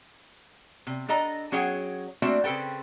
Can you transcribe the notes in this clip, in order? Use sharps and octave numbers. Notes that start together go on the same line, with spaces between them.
C3
D4 A4 D#5 A#5
F#3 C#4 G#4 C#5 G5
A3 A#3 C4 D4 F#4 E5
C#3 C4 A4 B4 G5